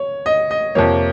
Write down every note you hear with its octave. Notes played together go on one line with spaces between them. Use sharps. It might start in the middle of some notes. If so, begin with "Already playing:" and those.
Already playing: C#5
D#5
D#5
F2 C3 F3 A#3 C#5